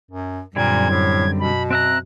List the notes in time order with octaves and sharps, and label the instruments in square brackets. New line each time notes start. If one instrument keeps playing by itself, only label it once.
[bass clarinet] F#2
[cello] F#2 [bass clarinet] A#2 [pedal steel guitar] D3 G3 C4 [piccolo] G#6
[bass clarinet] A2
[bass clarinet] B2 [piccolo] B5
[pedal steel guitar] C4 E5 A#5 [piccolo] F#6